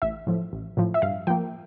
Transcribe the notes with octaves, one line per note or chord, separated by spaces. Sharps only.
A1 E5
A2 F3
A1
A2 F3
E5
G2 F5
F3 A#3 G5